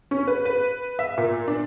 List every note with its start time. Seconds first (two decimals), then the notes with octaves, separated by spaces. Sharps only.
0.11 C#4
0.28 B4
0.45 B4
0.99 E5
1.17 A#2
1.48 D4